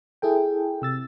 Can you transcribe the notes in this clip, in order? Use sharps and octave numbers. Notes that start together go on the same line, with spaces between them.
E4 G#4 A4 G5
C3 E6 A6